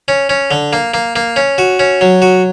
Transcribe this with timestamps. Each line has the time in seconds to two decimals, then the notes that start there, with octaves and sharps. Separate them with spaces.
0.08 C#4
0.29 C#4
0.51 D3
0.73 A#3
0.94 A#3
1.16 A#3
1.36 C#4
1.58 F#4
1.79 C#4
2.01 F#3
2.22 F#4